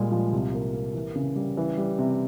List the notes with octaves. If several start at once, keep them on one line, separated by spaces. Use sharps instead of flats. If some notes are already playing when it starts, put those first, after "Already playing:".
Already playing: A#2 G3 G#3
F3
C2
A#3
A#3
E3
C#3
G3
E3
G3
C3